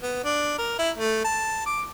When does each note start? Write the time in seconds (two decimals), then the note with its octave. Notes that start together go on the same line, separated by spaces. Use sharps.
0.03 B3
0.24 D4
0.58 A#4
0.79 E4
0.98 A3
1.24 A5
1.66 D6